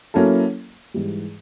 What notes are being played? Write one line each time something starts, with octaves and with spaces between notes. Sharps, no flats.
F#3 A#3 C#4 E4 A4
G#2 E3 G3